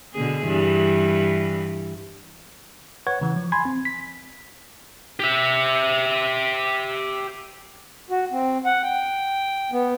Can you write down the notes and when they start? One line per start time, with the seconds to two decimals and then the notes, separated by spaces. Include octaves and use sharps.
0.14 B2 D3 G#4
0.44 G2 E3
3.07 B4 C#5 F#5 C#6 G#6
3.21 C#3 E3
3.36 F3
3.52 G#5 B5 C6 G#6
3.65 C4
3.85 B6
5.20 G4 E5
8.10 F#4
8.32 C4
8.65 F#5
8.82 G5
9.72 B3